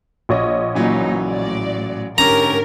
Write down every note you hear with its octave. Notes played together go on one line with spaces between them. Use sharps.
A#1 C#5 D#5
A#2 C#3 E3 F#3 D#4
A2 D5
G#2 D3 C#4 G4 A#4 A#5